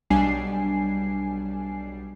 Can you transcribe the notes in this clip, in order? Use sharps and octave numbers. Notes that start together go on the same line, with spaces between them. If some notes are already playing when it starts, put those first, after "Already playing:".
B1 G3 D4 G#5 C7